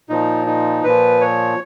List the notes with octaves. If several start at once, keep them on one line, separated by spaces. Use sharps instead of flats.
A#2 F3 D#4
D#4
A#2 F3 B4
C#5